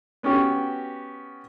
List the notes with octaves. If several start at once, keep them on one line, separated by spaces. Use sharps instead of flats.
B3 C#4 F#4 G4